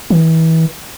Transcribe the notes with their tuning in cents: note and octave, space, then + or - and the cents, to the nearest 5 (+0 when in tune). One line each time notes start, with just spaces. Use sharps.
E3 -30